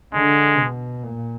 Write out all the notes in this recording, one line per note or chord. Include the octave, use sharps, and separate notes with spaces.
D3 G#3
B2
A#2